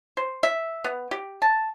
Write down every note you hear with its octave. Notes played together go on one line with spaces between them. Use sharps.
C5
E5
B3
G4
A5